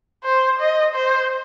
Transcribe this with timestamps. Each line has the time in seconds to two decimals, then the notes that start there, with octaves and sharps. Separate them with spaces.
0.24 C5
0.59 D#5
0.94 C5